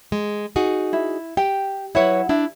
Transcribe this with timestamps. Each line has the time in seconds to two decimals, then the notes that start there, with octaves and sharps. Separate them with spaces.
0.12 G#3
0.56 D#4 F#4 G#4
0.93 E4
1.37 G4 G5
1.95 F#3 E4 B4 C#5 F#5
2.29 D4 E4